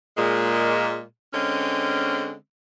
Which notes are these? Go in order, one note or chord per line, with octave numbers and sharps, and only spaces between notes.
A#2 G#3
D3 G#3 C4 C#4